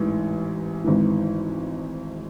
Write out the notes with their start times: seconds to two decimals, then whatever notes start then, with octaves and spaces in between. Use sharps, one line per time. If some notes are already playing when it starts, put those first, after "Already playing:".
Already playing: A1 G#2 E3
0.84 G#1 G#2 E3